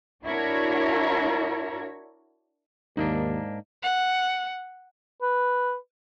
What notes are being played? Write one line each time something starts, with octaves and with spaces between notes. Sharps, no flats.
D4 E4 F#4 A#4 C#5
D#2 G#2 A#3 D4 D#4
F#5
B4